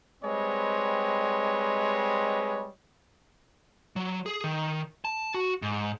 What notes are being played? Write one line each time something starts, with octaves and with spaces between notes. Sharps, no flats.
G3 G#3 C4 B4 C#5 D#5
F#3
G#4
D#3
A5
F#4
G#2